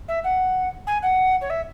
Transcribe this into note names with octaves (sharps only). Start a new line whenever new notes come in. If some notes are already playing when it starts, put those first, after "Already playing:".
E5
F#5
G#5
F#5
C#5
E5